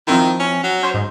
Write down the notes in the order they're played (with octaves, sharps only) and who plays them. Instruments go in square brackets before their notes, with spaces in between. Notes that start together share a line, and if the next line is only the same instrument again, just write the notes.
[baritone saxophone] D#3 [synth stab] F3 C4 E4
[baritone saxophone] C#4
F#3
[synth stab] C#4 C5
G#2